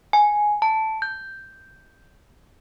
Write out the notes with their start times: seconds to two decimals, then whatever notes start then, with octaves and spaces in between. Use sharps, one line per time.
0.13 G#5
0.62 A5
1.02 G6